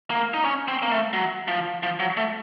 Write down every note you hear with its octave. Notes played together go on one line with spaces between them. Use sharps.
A#3
D#4
C#4
C4
A#3
A3
F#3
F3
F3
F#3
A3